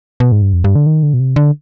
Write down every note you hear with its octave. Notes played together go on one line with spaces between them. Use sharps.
B2
G#2
G2
F2
G2
D3
D#3
D3
B2
C3
D3